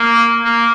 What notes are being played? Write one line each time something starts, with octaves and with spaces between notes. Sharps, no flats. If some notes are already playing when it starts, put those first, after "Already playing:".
Already playing: A#3
A#3